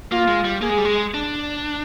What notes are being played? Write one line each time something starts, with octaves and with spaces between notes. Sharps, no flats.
A#3 F4
G#3
G3
A#3 G#4
G#3
G3
G#3
D4